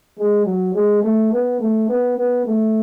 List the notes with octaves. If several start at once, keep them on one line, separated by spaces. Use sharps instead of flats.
G#3
F#3
G#3
A3
B3
A3
B3
B3
A3